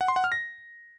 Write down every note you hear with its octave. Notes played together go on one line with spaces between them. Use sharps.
F#5
C6
F#5
F6
A#6